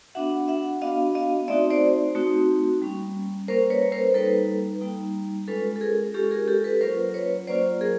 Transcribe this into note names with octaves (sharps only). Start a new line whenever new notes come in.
B3 D4 F#4 E5 F#5
E5 F#5
B3 D4 F#4 D#5 F5
D#5 F5
A3 C4 D#4 F#4 D5 E5
C5 D5
A3 C4 D#4 F#4
G3 A#3 C#4
G3 A#3 C#4 A#4 C5
B4 C#5
A#4 C5
G3 A#3 D#4 A4 B4
G3 A#3 D#4
G#3 C#4 F4 A4 B4
A4
G#4 A#4
G#3 C#4 F4 G4 A4
G#4 A#4
G4 A4
A4 B4
F#3 A#3 C#4 F4 A#4 C5
B4 C#5
F#3 A#3 C#4 F4 C5 D5
G#4 A#4